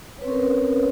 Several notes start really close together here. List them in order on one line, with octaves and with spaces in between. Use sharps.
C#5 B4 C4 C#4 A#4